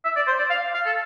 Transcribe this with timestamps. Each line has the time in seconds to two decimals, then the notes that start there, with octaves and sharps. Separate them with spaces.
0.04 E5
0.16 D5
0.27 C5
0.38 D5
0.50 F5
0.74 F5
0.85 A4